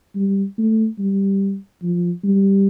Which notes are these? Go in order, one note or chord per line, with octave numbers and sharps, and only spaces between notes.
G3
A3
G3
F3
G3